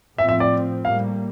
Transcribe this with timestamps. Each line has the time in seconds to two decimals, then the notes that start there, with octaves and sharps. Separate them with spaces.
0.18 A2 F3 C4 E5
0.29 E5
0.40 D5
0.84 A2 G3 A#3 F5